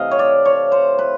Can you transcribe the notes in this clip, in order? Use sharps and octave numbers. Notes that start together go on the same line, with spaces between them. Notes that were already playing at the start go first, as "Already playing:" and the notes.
Already playing: C3 E3 A3 D#5 F5
C#5
D5
C#5
C5
B4